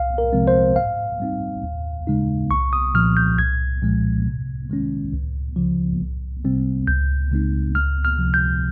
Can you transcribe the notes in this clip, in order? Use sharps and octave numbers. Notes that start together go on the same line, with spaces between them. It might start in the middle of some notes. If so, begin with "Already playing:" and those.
Already playing: C2 F5
A#4
C3 F3 G#3 C4
C5
G#2 F5
G3 C4 D#4
D#2
C#3 G#3 D#4
C2 C#6
D#6
A#2 F3 F6
G6
C2 G#6
A#2 F3 G#3
C3
D#3 G#3 C#4
C#2
C#3 F3
C2
C3 G3 C4
C#2 G6
C#3 G#3 C4 D#4
C#2 F6
F6
C3 F3
G6